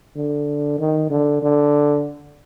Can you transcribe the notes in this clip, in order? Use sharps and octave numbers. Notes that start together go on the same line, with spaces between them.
D3
D#3
D3
D3